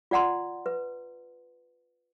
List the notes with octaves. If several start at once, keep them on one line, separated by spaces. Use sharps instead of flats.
F4 D5 F#5 A#5 C6
B4